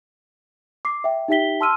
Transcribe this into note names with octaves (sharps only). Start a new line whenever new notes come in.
D6 C7
E5 G5
D#4 G4 E5 G5 B6 G7
A5 C6 E6 F6 D#7